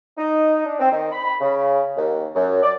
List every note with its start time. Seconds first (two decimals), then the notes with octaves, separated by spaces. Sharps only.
0.18 D#4
0.66 D4
0.80 C4
0.92 D#3
1.12 B5
1.24 B5
1.41 C#3
1.96 D#2
2.35 F#2
2.63 D5